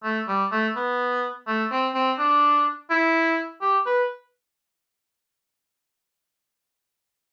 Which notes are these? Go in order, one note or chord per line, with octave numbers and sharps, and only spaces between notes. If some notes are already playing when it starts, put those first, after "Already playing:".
A3
G3
A3
B3
A3
C4
C4
D4
E4
G4
B4